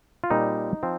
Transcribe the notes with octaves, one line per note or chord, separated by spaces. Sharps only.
F4
A#2 G3 C4 D#4
F3 C4